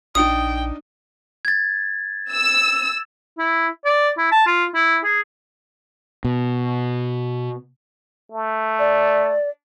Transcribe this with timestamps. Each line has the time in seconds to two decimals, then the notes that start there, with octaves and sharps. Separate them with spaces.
0.15 A#1 D4 D#4 G5 D#6
1.45 G#6 A6
2.32 E6
3.39 E4
3.86 D5
4.18 E4
4.32 A5
4.46 F4
4.75 E4
5.04 G#4
6.24 B2
8.32 A3
8.79 D5